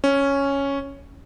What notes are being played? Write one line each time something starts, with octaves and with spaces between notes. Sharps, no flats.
C#4